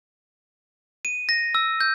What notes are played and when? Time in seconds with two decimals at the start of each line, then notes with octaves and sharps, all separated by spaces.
1.05 D#7
1.29 A#6
1.55 E6
1.81 G6